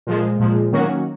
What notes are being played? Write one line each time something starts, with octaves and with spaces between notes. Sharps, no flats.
A#2 F3 G#3
A#2 F3 G#3
D#3 F#3 A#3 C#4 F#4